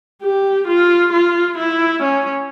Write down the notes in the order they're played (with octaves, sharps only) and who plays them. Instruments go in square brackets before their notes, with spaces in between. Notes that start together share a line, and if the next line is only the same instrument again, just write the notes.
[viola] G4
F4
F4
E4
C#4